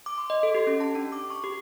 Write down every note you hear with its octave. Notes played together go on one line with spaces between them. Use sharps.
D6
C6
D#5
A4
G4
C#4
A5
D4
D6
C#6
G4